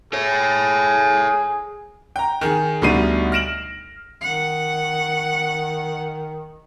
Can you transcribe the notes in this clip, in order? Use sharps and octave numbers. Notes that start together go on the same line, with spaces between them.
G#4 A4 C#5
G5 A#5
D#3 G#4
D2 B2 G3 D#4 C7 D#7
F6 A#6 D7 E7 F#7
D#3 F#5